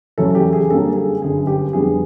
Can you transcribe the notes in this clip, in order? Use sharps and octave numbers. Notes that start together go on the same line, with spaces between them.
E2 C#3 F#3 A3 C#4 A4
G4
G#4
F#2 D3 G3 A#3 C#4 A4
G#4
G1 F#2 D3 G#4
G4
F2 D3 G3 B3 G#4